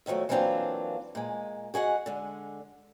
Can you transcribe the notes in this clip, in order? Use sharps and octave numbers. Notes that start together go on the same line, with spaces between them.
E2 D#3 F3 F#3 A3
E3 F#3 A#3 C4 D4 F4
A#2 G#3
F#4 G#4 D#5 F#5
D3 G#3